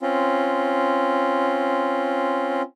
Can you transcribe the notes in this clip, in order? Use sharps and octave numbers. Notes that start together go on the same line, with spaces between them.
C4 C#4 F4